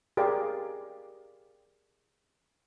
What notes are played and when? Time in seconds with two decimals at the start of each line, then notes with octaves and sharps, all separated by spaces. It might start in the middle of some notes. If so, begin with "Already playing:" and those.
0.17 G4 G#4 A#4 D5 F5